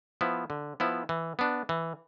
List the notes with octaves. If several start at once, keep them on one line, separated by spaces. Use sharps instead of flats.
F3 B3 E4
D3
F3 B3 E4
E3
B3 D4
E3